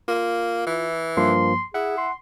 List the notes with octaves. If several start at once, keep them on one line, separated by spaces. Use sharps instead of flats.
A#3 F4
E3
G2 F3 A#3 C6
E4 G#4 F#5
C6